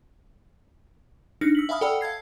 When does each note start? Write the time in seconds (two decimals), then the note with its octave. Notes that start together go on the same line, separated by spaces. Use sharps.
1.41 D4 D#4 F6 A#6 C#7
1.55 E6 B6 F#7
1.69 E5 F5 G#5 B5 D#6 F6
1.81 A4 D5 F#5 G5 B5 E6
2.01 F5 A5 G#6 C7